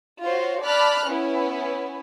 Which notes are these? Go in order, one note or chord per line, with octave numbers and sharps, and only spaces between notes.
F4 F#4 C5 C#5
D5 A5 B5 F6 F#6
B3 C#4 E4